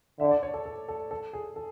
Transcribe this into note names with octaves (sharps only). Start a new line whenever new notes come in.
D3 E5
D5
C#5
A4
A4
A4
A4
G#4
A4